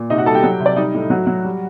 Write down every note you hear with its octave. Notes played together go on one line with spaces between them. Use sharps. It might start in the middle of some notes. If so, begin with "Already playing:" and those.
Already playing: A#2
C3 D#4 D#5
F#4 F#5
G3 A4 A5
G4 G5
F#3
C3
D5
G3 D#4 D#5
A2
F#3 F#4
F#3
G3